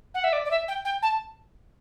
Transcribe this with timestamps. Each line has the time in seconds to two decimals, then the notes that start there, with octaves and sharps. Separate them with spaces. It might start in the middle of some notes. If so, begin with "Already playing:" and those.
0.14 F#5
0.24 E5
0.33 D5
0.45 D5
0.51 E5
0.68 G5
0.85 G5
1.02 A5